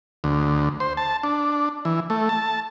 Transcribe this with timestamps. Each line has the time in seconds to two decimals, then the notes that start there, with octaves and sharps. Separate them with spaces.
0.24 D2
0.80 C5
0.97 A5
1.24 D4
1.85 E3
2.10 A3
2.29 A5